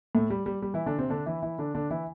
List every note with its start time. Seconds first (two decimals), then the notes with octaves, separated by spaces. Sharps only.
0.15 A2 A3
0.30 G3
0.46 G3
0.62 G3
0.74 E3 E4
0.86 D3 D4
0.98 C3 C4
1.10 D3 D4
1.26 E3 E4
1.42 E3 E4
1.59 D3 D4
1.75 D3 D4
1.90 E3 E4